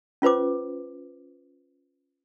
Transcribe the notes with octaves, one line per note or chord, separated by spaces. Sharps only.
C#4 F4 B4 C5 D6